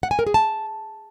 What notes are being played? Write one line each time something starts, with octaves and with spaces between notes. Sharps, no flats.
F#5
G#5
A#4
G#4
A5